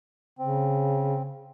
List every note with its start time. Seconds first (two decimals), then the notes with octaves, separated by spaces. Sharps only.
0.39 C#3 C4